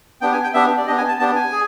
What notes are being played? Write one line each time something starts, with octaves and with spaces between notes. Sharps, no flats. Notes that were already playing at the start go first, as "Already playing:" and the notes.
B3 D4 G4 G5
G#5
G5
B3 D4 G4 E5
D5
B3 D4 G4 D#5
G#5
A5
B3 D4 G4 A5
G#5
G#4